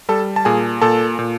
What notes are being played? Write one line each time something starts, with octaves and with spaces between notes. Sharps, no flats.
G3 A4 A5
A5
A#2 G#4 G#5
A#2 A4 A5
A#2